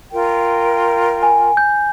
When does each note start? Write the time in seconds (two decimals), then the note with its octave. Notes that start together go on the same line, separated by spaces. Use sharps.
0.13 F4 A#4 G5
1.23 G#5
1.57 G6